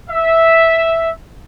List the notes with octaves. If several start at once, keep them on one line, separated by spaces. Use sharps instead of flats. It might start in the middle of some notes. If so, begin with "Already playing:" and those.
E5